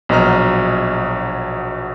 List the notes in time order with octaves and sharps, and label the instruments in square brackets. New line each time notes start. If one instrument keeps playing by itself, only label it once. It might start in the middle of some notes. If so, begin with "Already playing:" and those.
[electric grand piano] A#1 B2 F#3 D#5 A#5 F6